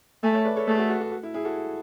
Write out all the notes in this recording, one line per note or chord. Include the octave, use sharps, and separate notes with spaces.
A3 E5 G#5
C#5 E5
B4 D5
A4 C#5
A3 G#4 B4
F#4 A4
F#4 A4
F#4
F#4
E4
E4 G#4
F#4 A4